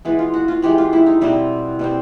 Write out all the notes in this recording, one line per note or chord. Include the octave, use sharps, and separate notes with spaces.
E3 G#3 B3
F4
F#4
F4
E3 G#3 B3 G4
F4
E4
D#4
B2 G3 C4 E4
B2 G3 C4